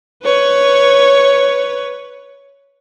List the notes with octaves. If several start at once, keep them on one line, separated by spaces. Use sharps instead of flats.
B4 C#5